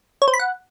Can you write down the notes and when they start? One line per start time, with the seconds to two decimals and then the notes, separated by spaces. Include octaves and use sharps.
0.22 C#5
0.28 C5
0.34 B5
0.39 F#5